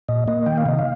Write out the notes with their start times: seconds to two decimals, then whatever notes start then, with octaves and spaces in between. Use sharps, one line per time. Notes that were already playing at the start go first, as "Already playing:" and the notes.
0.09 A#2 D#5
0.28 A#3 D#5
0.46 D#3 G5
0.58 F5
0.66 C3 D#5
0.79 F5